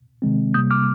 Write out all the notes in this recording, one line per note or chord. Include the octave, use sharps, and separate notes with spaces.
C3 D#3 G#3 C4
C3 G3 A#3 D#6 G6
D6 F6